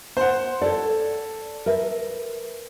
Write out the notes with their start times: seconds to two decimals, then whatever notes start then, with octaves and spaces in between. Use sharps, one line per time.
0.17 C5 F#5
0.62 A4 C#5 D5
1.66 A#4 B4 E5